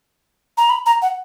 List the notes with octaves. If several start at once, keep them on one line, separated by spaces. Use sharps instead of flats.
A#5
B5
A#5
F#5